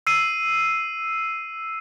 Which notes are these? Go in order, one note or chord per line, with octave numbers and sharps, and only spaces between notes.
E6 C7 D#7